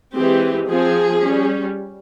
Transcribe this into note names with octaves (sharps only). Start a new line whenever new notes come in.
E3 G#3 C4 G4
F3 C4 G#4
G3 C#4